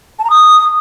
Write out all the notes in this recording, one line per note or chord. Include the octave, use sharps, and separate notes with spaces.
A5
A#5
D#6